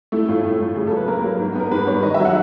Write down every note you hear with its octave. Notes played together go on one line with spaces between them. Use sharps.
A3 E4
A2 F4
A2
A2
C#3 G#4
F#3 A4
B4
A#3 A#4
F#3
G#2
B3 A#4
G#2 B4
G3 C#5
D#3 D#5
E5
F#3
F#5